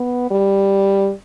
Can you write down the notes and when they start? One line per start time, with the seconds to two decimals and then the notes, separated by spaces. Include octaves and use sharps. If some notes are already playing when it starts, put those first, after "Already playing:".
Already playing: B3
0.31 G3